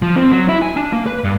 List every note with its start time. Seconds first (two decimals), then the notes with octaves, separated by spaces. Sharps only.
0.02 F3
0.16 C4
0.32 F#3
0.49 E4
0.62 G#5
0.76 D4
0.93 A#3
1.07 B4
1.24 G2